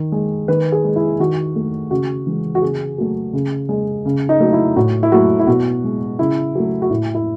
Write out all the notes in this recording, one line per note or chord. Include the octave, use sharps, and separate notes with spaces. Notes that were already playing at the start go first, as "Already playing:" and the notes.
Already playing: D#3
G#3
D#3 B4
G#4
G#3
E4
D#3 F#4
A3
C#3 F#4
E3 G#3
F#4
C#3 G#4
F#3 A3
C#3
G#3
C#3
D#4
F#3 A3
E4
A2 F#4
E4
F#3 A3 F#4
E4
B2 F#4
G#3
C#3 E4
F#3 A3
F#4
A2 E4
E4